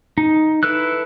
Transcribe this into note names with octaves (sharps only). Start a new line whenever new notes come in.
D#4
E4 A4 B4 E6 F#6